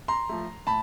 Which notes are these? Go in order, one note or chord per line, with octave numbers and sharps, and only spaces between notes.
A#5 C6
F3 A3
A2 A5 B5